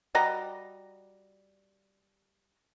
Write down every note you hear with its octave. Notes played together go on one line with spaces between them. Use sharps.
G3 F#4 D#5 A#5